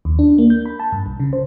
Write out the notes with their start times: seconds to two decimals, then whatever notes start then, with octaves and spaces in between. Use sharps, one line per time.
0.05 D#2
0.19 D4
0.38 A#3
0.50 G6
0.66 B5
0.80 A5
0.92 G2
1.06 B1
1.20 C#3
1.33 C5